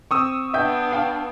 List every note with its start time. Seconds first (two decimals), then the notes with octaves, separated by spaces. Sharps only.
0.11 C4 C#6 D#6 E6
0.54 B3 D4 E5 G5 G6
0.92 F5 G5